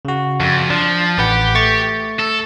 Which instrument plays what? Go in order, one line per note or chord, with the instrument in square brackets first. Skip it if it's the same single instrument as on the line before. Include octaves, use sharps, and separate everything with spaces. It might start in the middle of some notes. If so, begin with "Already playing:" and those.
[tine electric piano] C#3 F#4
[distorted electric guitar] F2
[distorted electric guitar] F3 [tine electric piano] D4
[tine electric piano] A1 B4 F#5 [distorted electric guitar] G4
[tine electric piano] A3 C#6 A6
[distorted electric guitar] A4